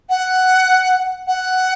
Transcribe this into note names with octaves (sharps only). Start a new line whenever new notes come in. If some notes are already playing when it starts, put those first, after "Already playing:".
F#5
F#5